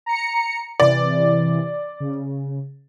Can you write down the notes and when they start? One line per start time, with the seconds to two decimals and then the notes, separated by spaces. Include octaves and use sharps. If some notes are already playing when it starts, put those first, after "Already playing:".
0.06 A#5 C#7
0.80 C3 E3 D5
2.00 C#3